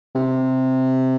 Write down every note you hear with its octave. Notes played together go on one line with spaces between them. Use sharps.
C3